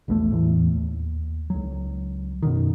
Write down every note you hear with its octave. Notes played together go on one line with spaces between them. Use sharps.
A#1 E2 D#3 A3
E2 A2 E3
D#2
C#2 F#3
F#2 B2 D#3